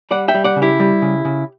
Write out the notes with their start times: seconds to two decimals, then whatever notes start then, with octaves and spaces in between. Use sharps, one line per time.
0.11 G3 D5 F#5
0.28 E5 G5
0.34 G3
0.44 D5 F#5
0.56 C#3
0.62 E4 G4
0.80 G3
1.02 C#3
1.25 C#3